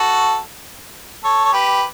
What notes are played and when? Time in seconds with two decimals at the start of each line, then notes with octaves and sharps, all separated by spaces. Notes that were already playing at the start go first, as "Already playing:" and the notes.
Already playing: F#4 A4
1.24 A4 C#5
1.45 C#5
1.53 G4 B4